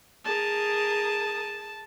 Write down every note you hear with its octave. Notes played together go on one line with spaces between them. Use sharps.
G#4 A#4 A5 D#6